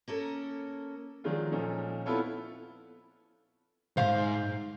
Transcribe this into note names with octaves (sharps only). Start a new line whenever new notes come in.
A#3 C#4 A4 A#4
D#3 F3 F#3 G#3 D4 F4
A#2 F3 C#4 D#4 A4
B3 C4 E4 F4 A4 C#5
C2 G#2 C5 F5